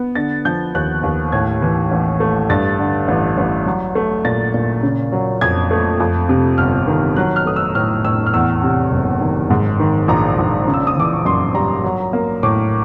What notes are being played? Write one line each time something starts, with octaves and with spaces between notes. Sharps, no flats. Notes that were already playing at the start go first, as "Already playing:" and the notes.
Already playing: B3
D3 A6
F3 G6
D#2 F#6
D#2
A2 G#6
E3
A1
A3
G2 A6
D3
A1
A1
F#3
A3
A#2 A6
A#2
C#3
F#3
F2 G#6
A3
F2
C3
G1 F6
D#3
F#3 F#6
F6
A3 D#6
E6
A2 F6
A2 E6
F6
E2 E6
C3
F#1
D#3
G#2
D#3
A#1 A#5
A#1
C#3
E6
D#6
E3 D6
C#6
F#2 C6
G3 A#5
F#3
A#3
A2 D6